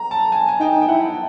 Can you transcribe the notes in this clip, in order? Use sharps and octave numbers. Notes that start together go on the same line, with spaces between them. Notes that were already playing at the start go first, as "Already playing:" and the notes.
Already playing: A#5
A5
G#5
G#5
D#4 G5
G5
E4 F#5